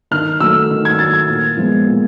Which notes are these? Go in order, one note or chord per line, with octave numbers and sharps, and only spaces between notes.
D#3 F6
F#3 A3 E6
D#3
G#6
F#3 A3 A6
G#6
A#2
F3 G#3 B3
A#2